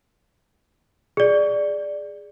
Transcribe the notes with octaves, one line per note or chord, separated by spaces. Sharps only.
G#4 D5